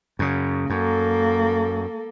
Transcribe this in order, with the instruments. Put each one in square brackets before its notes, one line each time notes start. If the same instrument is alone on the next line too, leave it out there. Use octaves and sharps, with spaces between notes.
[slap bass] F#2 C#3
[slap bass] F#2 [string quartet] A#3 A4